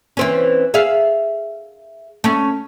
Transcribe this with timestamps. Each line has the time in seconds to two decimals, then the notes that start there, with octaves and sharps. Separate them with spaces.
0.17 E3 C4 C#4
0.74 G#4 E5 F5
2.24 A3 C#4